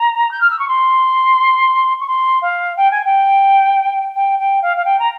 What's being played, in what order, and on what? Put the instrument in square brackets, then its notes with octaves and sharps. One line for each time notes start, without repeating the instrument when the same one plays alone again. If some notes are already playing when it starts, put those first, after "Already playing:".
Already playing: [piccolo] A#5
G6
F6
E6
C#6
C6
C#6
C6
F5
G5
G#5
G5
G5
G5
F5
F5
G5
A#5